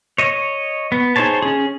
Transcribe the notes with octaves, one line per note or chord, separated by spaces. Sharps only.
C#5 D#5
B3
D#4 G#4 C5 C#5 A5
C#4 G#4